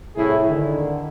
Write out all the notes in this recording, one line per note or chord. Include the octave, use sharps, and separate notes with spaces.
C2 A2 E4 G#4
D3 D#3